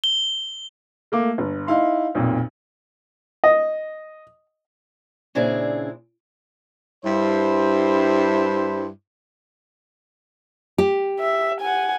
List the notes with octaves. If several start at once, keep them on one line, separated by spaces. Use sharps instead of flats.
G7
A3 A#3 D6
G1
D#4 E4 F5 C6
B1 F2 A#2
D#5
A#2 C#3 C4 D4 E4 G#4
G2 E4 C5
G4
E5
F#5 G#5